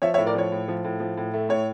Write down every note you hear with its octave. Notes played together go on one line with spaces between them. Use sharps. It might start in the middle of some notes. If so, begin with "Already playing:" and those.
F3 C#5 E5
C#5 E5
A2
A#4 D5
F3 C#5
A2
F3
A2
F3
A2
A3
A2 C#5